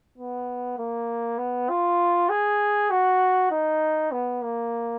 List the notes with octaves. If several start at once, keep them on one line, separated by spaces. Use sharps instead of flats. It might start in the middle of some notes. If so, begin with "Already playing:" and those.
B3
A#3
B3
F4
G#4
F#4
D#4
B3
A#3